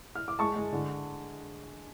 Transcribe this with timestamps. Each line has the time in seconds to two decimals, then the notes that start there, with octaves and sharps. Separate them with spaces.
0.15 F6
0.28 D6
0.39 G#3 A5 C#6
0.56 G#3
0.72 D3